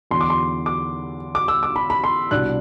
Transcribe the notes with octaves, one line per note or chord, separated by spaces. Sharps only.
E2 D3 F#3 C6
D6
C6
D6
D6
E6
D6
B5
B5
C6
C2 B2 G3 D4 F#6